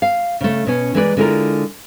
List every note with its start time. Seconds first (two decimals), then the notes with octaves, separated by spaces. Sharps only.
0.02 F5
0.41 C#3 A3
0.67 B2 C#4
0.94 E3 G#3 A#3 B4 C5 D5
1.17 D3 G#3 E4 F4 G4 A#4